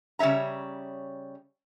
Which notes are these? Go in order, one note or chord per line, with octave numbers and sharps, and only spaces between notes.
C#3 G3 C#5 E5 A#5